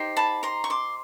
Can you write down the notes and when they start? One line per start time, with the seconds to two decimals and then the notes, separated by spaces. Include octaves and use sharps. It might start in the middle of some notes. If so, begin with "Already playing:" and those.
Already playing: D#4 G4 C5
0.17 A5 B5
0.43 A#5 C6
0.64 C#6
0.70 C6 D6